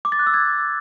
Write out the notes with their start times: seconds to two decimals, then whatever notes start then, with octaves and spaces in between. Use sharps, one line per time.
0.05 D6
0.12 A6
0.19 F#6
0.27 E6
0.34 G#6